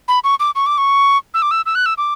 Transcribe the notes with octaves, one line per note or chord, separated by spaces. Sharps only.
B5
C#6
D6
C#6
D6
C#6
E6
D6
E6
E6
F#6
E6
D6